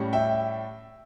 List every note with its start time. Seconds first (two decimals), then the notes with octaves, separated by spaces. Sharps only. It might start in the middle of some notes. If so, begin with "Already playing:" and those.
Already playing: A2 G3 C#4
0.13 E5 G5